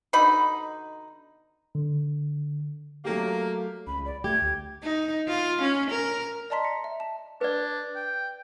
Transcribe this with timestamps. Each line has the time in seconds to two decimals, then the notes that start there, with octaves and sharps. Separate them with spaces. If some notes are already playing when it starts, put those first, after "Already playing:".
0.13 B2 D3 D#4 B5
1.75 D3
3.05 F#3 A3 A#3 G4
3.87 C#2 B5
4.05 D5
4.24 A3 G4 G#6
4.42 D2
4.83 D#4
5.28 F4
5.62 C#4
5.90 A#4
6.50 D5 D#5 A5 A#5 C6 B6
6.63 A#6 C#7
6.84 E5
7.00 A5
7.41 D4 B4 D5
7.96 G5